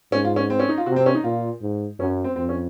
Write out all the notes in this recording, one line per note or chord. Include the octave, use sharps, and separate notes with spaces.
G#2 C#4
F4
C#4
C4
C#4
D#4
F4
C3 F#4
C4
C#4
D#4
A#2 F4
G#2
F#2 C#4
C4
F2 C4
C#4